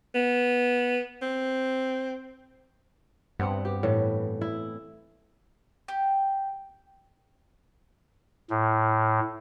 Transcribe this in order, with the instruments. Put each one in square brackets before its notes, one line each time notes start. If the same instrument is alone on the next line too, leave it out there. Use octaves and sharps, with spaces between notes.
[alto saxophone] B3
C4
[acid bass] G2 [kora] B3 C4 F#5
[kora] G4
A2 E3
E4
[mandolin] G4
[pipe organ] A2